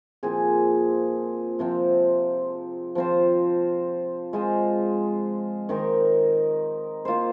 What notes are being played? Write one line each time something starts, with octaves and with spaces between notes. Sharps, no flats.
A#2 F3 C4 G#4
C3 F3 C4
F3 C4 F4 C5
G#3 F4 C5 D#5
D#3 C4 D#4 A#4
A#3 F4 C5